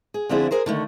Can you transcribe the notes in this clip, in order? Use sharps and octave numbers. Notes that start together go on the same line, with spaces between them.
G#4
D3 F3 C4 D4 E4 G#4
G#4 A#4 C5
D3 D#3 A3